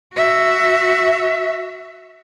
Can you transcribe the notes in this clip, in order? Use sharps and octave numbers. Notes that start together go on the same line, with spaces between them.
F#4 E5